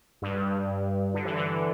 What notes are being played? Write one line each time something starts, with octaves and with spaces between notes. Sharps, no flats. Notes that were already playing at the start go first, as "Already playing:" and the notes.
G2
D3
E3
D3